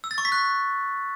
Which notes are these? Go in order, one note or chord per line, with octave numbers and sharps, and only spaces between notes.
E6
A6
C#6
B6
F#6